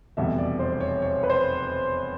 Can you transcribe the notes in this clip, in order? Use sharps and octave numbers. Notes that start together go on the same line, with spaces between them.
F1 E2 B2 G3 E5
D5
C5
C#5
C#5
B4
C5